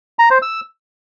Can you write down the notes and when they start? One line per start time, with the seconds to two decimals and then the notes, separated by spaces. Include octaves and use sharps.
0.19 A#5
0.31 C5
0.42 E6